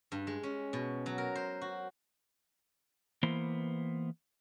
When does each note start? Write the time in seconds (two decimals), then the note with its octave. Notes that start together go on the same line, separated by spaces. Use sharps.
0.12 G2
0.27 G#3
0.43 C#4
0.73 B2
1.06 F#3
1.18 A#4
1.35 C5
1.61 F#4
3.23 E3 A#3 B3 C5